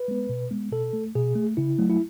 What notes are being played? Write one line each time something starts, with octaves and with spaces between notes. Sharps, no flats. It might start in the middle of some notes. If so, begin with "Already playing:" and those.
Already playing: B4
G#3 B3
B2
G#3 B3
B2 A4
A3
B2 G#4
A3
C#3 E4
F#3 A3
E4